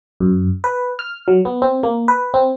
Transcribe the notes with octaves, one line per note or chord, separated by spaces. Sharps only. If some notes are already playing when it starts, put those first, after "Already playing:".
F#2
B4
F6
F#3
B3
C4
A#3
B4
C4